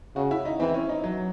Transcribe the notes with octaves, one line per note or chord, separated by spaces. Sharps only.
C#3 F#4
E4
D#4
E3 C4
C#4
D#4
F#3